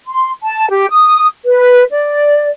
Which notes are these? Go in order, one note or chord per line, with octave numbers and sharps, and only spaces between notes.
C6
A5
G4
D#6
B4
D5